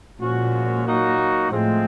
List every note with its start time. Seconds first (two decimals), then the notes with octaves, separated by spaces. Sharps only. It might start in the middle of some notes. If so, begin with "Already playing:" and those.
0.20 A#2 F3 G#3 C#4 F#4
0.85 F#3 A#3 D#4 F#4
1.50 A2 F3 G#3 C4